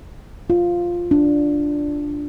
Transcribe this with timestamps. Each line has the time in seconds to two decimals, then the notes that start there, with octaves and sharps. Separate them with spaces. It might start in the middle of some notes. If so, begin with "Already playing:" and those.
0.50 F4
1.11 D4